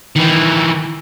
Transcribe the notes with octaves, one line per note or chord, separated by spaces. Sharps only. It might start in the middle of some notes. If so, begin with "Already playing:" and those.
D#3 E3